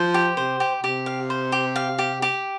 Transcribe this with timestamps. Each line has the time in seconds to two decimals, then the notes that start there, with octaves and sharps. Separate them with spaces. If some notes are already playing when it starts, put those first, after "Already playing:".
Already playing: F3 C5
0.14 G4
0.37 C3 C5
0.60 G4
0.83 C3 G4
1.06 F5
1.30 C5
1.52 G4
1.76 F5
1.99 G4
2.22 G4